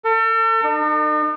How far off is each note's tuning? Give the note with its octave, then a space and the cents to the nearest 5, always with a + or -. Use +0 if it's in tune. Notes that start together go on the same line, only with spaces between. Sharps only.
A4 +40
D#4 -45